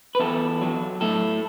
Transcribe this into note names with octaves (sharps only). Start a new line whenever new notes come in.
B4
E2 A4
F#3
A2 A4